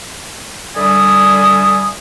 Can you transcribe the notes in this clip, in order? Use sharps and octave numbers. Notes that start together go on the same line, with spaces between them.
D3 G3 D5 E5 G#5 D#6